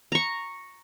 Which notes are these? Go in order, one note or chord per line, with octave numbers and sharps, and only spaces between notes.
A#5 C#6